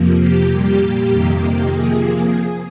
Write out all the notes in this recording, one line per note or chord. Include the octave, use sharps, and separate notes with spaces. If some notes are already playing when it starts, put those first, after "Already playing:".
Already playing: F2 C3 F3 A#3
G4
A#2 G3 A#3
F2 C3 D#3 A#3
G4
C3 F3 A#3 G#4